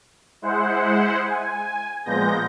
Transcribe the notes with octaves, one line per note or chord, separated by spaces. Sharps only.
G#3 E4 C5 F#5
G#5
A#2 F3 G#3 B3 G6 A#6